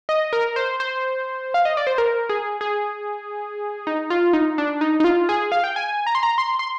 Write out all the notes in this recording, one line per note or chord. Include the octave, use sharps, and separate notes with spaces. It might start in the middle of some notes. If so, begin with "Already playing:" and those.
D#5
A#4
C5
C5
F5
D#5
D5
C5
A#4
G#4
G#4
D#4
F4
D#4
D4
D#4
D#4
F4
G#4
F5
G5
G#5
A#5
C6
A#5
C6
C6